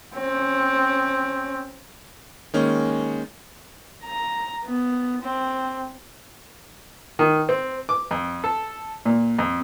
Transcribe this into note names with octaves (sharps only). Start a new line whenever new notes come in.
C4 C#4
D#3 G#3 A#3 C#4
A#5
B3
C4
D#3
C4
D6
F2
A4
A#2
F2